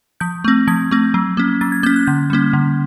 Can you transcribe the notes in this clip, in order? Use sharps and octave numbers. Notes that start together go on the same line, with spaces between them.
F3 G6
A3 C4
F3 G#6
A3 C4
F#3
A#3 C#4
F#3 A6
G#6
A#3 C#4 G6
F#6
D3 G6
G3 A#3 C#4
D3